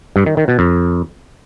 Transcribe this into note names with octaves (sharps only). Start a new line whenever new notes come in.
G2
D#3
D#3
B2
F2